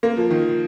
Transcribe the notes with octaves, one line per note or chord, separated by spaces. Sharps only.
A#3
F3
D#3